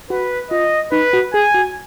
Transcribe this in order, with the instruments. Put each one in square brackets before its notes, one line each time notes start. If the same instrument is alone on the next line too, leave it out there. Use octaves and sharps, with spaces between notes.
[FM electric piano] F#4 [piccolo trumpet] B4
[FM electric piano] F4 [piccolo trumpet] D#5
[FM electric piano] D#4 [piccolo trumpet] B4
[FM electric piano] F#4
[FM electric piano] G#4 [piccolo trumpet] G#5
[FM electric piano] F#4